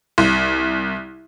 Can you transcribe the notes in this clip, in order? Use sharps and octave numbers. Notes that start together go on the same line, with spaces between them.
C2